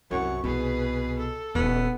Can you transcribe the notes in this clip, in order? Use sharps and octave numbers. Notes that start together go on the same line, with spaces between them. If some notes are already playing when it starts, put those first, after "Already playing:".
C2 F#2 F#5 C#6
C2 B2 G#4 B4
A4
D#1 B3